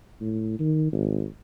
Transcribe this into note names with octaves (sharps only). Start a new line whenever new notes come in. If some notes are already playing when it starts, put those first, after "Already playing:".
A2
D#3
G#1